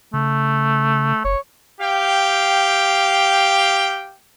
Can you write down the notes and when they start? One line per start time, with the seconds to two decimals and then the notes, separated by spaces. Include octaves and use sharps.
0.14 C#3 A3
1.25 F#1 C#5
1.80 G4 F5 G5